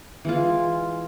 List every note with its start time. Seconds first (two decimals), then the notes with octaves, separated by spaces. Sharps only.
0.25 E3 G#3 F4